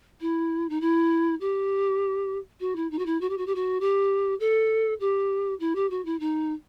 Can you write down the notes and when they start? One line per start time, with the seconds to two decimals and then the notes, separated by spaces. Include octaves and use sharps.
0.21 E4
0.69 D#4
0.81 E4
1.41 G4
2.60 F#4
2.76 E4
2.91 D#4
2.99 F#4
3.06 E4
3.21 F#4
3.29 G4
3.38 F#4
3.47 G4
3.55 F#4
3.81 G4
4.40 A4
5.00 G4
5.60 E4
5.75 G4
5.90 F#4
6.05 E4
6.20 D#4